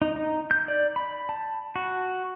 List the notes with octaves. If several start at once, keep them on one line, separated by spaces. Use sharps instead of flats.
D#4
D#4
G6
D5
B5
A5
F#4